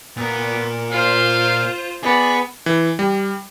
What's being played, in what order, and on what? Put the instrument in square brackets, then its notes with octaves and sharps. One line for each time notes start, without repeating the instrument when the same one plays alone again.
[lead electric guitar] A#2 A#4 [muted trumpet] B3
[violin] F4 C5 [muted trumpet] F5
[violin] B3 [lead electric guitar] G#4 [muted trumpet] D5
[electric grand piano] E3
G3